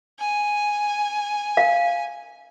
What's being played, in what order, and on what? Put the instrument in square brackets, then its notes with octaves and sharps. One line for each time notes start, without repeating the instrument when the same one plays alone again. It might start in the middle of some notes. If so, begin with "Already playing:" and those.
[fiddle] G#5
[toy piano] F5